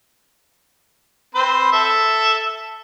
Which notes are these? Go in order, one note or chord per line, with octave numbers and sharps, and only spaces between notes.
C4 B4 C5
A4 E5